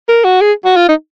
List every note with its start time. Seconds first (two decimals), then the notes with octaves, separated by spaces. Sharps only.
0.09 A#4
0.24 F#4
0.41 G#4
0.65 F#4
0.76 F4
0.89 D#4